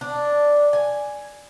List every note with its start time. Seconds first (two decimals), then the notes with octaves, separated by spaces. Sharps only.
0.01 D4
0.73 G#5